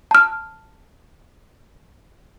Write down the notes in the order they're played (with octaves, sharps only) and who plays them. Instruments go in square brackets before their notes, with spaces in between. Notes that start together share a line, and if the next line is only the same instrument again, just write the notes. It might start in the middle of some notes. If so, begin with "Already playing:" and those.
[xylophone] A5 F6